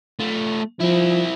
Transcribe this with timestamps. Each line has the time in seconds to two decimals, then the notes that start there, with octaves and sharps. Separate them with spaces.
0.20 A3 F4
0.80 F3 C4 E4